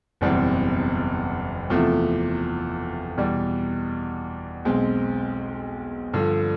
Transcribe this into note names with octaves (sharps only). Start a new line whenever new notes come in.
F#1 E2 B2 G3 C4
E2 C3 F3 A3
E2 B2 G3
B1 B2 G#3 C4
G2 D3 F3